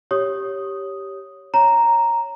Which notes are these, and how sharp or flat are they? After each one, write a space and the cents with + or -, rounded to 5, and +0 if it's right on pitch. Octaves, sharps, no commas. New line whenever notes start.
G4 +0 C#5 +0 D#6 +0
C#5 +0 A#5 +0